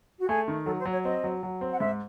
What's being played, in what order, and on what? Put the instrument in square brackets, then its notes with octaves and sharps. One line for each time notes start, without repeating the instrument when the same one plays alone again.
[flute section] F#4
[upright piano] A3 [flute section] G#4
[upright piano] D#3
[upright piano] F#3 [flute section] A4
[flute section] C5
[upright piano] F#3
[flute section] C#5
[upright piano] C4 [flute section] D#5
[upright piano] F#3
F#3
C4
[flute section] F#5
[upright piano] G#2 [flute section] E5